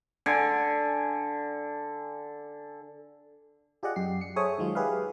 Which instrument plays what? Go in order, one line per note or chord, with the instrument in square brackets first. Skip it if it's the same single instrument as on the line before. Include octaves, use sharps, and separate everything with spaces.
[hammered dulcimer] D3 G#5
[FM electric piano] F4 G4 G#4 D5 D#5 F#5
F#2 G4 C7
C#7
G#4 A4 C5 C#5 E5 D#6
D#3 F#3 G#3 F4
G4 G#4 B4 E5 F5